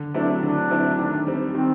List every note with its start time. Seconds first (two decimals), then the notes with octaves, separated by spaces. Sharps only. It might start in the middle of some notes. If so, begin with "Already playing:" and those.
Already playing: D3
0.14 F#3 A3 C4 D4 E4
0.43 D3 D4
0.71 F#3 A3 C4 E4
0.98 D#3
1.27 G3 C4
1.54 D#3 C4